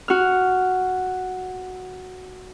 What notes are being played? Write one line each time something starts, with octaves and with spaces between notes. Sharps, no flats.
F#4 F6